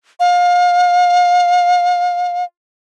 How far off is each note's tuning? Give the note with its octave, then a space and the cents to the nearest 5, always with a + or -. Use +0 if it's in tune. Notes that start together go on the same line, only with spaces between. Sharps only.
F5 +30